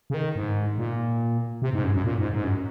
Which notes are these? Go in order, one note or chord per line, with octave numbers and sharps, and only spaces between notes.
C#3
D#3
G#2
A#2
C3
G#2
F#2
F#2
A#2
G#2
G#2
F#2